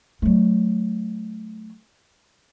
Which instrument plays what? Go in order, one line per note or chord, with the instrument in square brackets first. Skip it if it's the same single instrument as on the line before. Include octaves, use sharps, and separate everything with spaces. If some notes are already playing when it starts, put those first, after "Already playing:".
[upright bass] F#3 A3